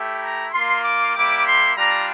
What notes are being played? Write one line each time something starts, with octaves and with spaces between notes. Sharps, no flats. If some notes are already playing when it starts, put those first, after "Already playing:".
Already playing: A3 E4 G4
A#5
A#3 F4 C6
D6
G3 A#3 E4 G4 D6
C6
G3 D4 F4 A#5